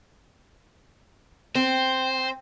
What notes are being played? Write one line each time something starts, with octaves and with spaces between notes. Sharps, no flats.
C4 C5